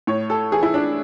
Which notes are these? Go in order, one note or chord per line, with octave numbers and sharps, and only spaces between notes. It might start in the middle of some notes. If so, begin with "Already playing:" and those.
A2 C#5
A4
E3 G#4
E4
D4